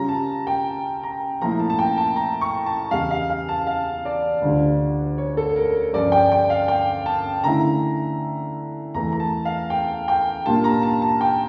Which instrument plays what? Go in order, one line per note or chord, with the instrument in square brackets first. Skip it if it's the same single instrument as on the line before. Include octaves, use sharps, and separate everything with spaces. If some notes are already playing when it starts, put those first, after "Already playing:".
Already playing: [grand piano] C#3 G3 C#4 F4 A#5
A5
G5
A#5
A#2 F3 A3 E4 A#5
A5
A5
G5
A5
A#5
C#6
A5
E2 C#3 G3 F5
F5
F5
A5
F5
D5
D2 D3 G3 D4 F4
C#5
A4
A#4
G2 F3 C#4 D5
G5
G5
F5
G5
A5
D3 A3 C#4 E4 A#5
E2 E3 A3 A#5
A#5
A5
F5
G5
G5
A#2 G3 A#3 D4 F4 A5
A#5
A5
A5
G5